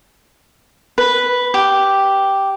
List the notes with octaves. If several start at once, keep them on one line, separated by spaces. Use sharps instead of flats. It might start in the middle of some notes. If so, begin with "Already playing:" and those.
B4
G4